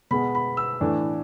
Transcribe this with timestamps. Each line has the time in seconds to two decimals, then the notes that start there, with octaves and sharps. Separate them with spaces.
0.11 B2 G#3 B3 B5
0.35 B5
0.57 E6
0.81 A2 E3 A3 D4